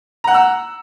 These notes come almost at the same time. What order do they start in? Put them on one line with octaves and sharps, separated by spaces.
A#5 F#5 F#6 E6